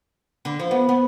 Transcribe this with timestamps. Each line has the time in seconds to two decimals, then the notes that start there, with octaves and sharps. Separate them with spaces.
0.45 D3
0.59 F3
0.71 B3
0.89 B3